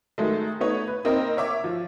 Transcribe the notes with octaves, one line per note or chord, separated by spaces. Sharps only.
D#3 F#3 G#3 A3
A3 B3 D#4 C#5
B4
A#3 C4 D#4 A#4 D#5 G5
C#5 E5 D6
F3